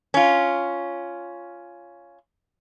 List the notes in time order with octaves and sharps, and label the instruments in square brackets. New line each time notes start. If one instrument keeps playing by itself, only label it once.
[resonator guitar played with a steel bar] C#4 F4